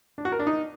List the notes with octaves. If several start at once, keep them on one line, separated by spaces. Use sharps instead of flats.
D4
F#4
A#4
D4
D#4